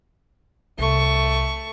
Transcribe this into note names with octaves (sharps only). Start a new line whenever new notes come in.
C2 A3 C#6